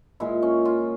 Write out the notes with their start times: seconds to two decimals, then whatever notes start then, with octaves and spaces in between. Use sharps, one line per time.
0.20 A#2 G#3 E4
0.42 C#4
0.65 F4